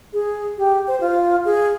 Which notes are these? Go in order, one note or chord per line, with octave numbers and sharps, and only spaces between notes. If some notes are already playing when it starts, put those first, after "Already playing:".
G#4
G4
C5
F4
G#4